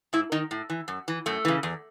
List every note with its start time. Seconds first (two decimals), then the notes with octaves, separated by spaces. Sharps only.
0.13 G#2 E4
0.32 D#3 D#4
0.51 A2
0.70 E3
0.88 F#2
1.08 E3
1.26 F#2 A3
1.45 C#3 E3
1.63 E2